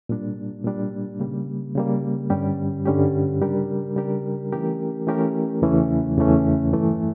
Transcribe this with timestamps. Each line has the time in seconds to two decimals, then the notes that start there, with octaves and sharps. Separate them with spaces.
0.09 A#2 G3 D4
0.64 A#2 G3 D4
1.20 C#3 G3 A#3
1.75 C#3 G3 A#3
2.30 G2 D3 G3 C#4 G4
2.85 G2 D3 G3 C#4 G4
3.41 C#3 G3 D4 G4 A#4
3.96 C#3 G3 D4 G4 A#4
4.52 E3 A3 C#4 G4 A#4
5.07 E3 A3 C#4 G4 A#4
5.62 E2 C#3 E3 A3 C#4
6.18 E2 C#3 E3 A3 C#4
6.72 G2 E3 A3